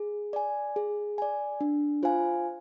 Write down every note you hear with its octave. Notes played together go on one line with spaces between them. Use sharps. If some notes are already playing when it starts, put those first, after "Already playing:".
Already playing: G#4
D5 G#5
G#4
D5 G#5
D4
F4 C5 F5 G#5